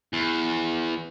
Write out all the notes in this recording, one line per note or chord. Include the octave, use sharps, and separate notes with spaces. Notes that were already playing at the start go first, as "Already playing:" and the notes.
E2